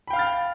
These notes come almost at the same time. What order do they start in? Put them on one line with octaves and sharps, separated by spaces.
B5 G5 F5 F6 A6